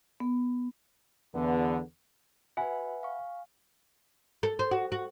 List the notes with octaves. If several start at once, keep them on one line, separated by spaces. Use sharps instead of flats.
B3
E2 D3 B3
F#4 B4 E5 F#5 G#5 B5
F5 C#6
A4
C5
F#4
F#4